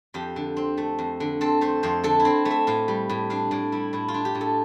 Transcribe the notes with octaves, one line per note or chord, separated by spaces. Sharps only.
F2 G4
D3
C4
A3
F2
D3
C4 A4
A3 C5
F2 C5
D3 A4
E4
C4
A3
E5
A2 F5
G3
A2
D4 F5
A2 D5
G3 E4
A2 E4
F4
D4
G4
A2
A4